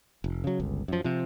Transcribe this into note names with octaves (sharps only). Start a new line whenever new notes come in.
F1
C#3 F#3
G1 C#2
F#2 F3
C3 F3